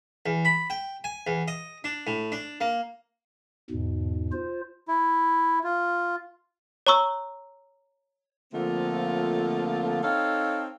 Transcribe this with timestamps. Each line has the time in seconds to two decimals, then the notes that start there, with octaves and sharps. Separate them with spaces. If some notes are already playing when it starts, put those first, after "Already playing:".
0.26 E2
0.45 B5
0.70 G5
1.04 G#5
1.27 E2
1.48 D#5
1.84 D4
2.07 A2
2.32 D4
2.61 A#3
3.71 E2 G#2 B2
4.32 F4 C5
4.88 E4
5.64 F4
6.87 C#5 A#5 C#6 E6
8.53 D3 F3 A3 A#3 C4 F4
10.03 C4 D#4 A4 C#5 F5